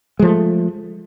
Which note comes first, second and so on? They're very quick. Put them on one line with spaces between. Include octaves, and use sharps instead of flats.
G#3 F3 A3